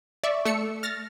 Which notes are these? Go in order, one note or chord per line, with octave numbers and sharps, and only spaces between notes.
D5 E5 C#6
A3 E6 C#7
F6 A6 A#6